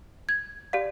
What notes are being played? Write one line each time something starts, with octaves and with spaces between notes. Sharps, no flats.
G#6
G4 D5 F5